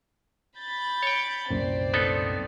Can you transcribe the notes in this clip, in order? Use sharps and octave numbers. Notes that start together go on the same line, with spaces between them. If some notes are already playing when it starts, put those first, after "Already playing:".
B5 G6 A6
C#5 G5
C2 F#2 A#2 C4 D5
B3 D#4 A4